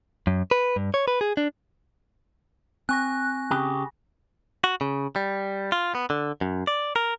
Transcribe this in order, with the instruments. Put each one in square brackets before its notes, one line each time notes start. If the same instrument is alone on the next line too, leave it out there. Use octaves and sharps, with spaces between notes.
[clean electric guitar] F#2
B4
G2
C#5
B4
G#4
D4
[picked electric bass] C4 [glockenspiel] G#5 C#6 A#6 [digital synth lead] F#6
[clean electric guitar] C#3 G4
F#4
C#3
G3
F4
B3
D3
F#2
D5
A#4